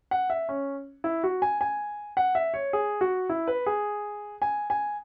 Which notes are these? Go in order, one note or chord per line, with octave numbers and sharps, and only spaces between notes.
F#5
E5
C#4
E4
F#4
G#5
G#5
F#5
E5
C#5
G#4
F#4
E4
B4
G#4
G#5
G#5